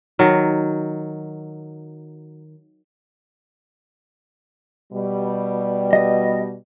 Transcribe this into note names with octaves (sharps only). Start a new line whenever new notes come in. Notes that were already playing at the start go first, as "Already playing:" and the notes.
D#3 F#3
B2 G3
D#5